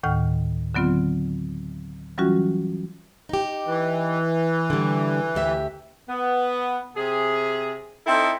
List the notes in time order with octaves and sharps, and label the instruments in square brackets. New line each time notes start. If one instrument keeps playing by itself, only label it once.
[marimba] D2 A2 D#3 G5 F6
D3 F#3 B3 C4 F4
E3 F#3 G3 C#4 F4 F#4
[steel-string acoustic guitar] D#4 G4
[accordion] E3
[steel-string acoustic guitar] D3 G3
D2 G4 E5
[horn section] B3
C3 G#4
C4 D#4 E4 A4